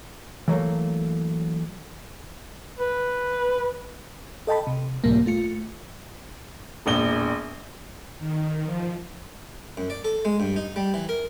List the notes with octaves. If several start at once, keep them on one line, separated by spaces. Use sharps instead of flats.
E3 F#3 A3 A#3
B4
A4 D#5 G5 A5 B5
C3
C#2 A2 C3 F3 G3 A#3
A3 F4 C#7
E1 A#1 G7
D#3
F3
F#2
D5
A4
G#3
G2
D#4
G3
E3
A#4